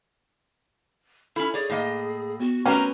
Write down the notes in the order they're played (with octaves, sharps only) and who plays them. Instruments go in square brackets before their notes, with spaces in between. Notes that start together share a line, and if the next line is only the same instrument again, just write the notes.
[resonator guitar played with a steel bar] C#4 E4 [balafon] A4 [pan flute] B5
[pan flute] G#4 [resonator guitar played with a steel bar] C#5 D5
[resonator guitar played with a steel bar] A2 A#3 D#5
[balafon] B3 [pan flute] F#4
[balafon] A3 F#4 [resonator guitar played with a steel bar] C4 A#4 B4 [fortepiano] C#4 [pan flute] A#5